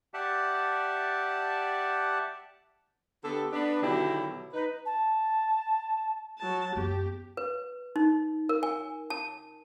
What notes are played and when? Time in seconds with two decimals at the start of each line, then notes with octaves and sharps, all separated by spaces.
0.14 G4 D5 E5 F#5 A5
3.24 D3 B3 D4 G4 A4
3.53 B3 D4
3.82 B2 D3 D#3 F#3 E4 G4
4.53 D#4 B4
4.86 A5
6.39 F#3 A5
6.76 F#2 B3 G4
7.37 B4
7.96 D#4
8.49 A#4
8.63 G#5
9.10 A5